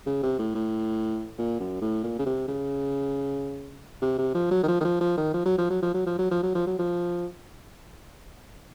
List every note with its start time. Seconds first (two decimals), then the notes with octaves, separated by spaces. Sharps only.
0.06 C#3
0.23 C3
0.39 A2
0.55 A2
1.38 A#2
1.60 F#2
1.82 A2
2.04 A#2
2.19 C#3
2.26 C3
2.48 C#3
4.02 C3
4.18 C3
4.35 F3
4.51 F#3
4.63 D#3
4.68 F3
4.80 D#3
4.84 F3
5.01 F3
5.17 D#3
5.34 F3
5.45 F#3
5.58 F3
5.70 F#3
5.82 F3
5.94 F#3
6.06 F3
6.18 F#3
6.31 F3
6.43 F#3
6.55 F3
6.67 F#3
6.79 F3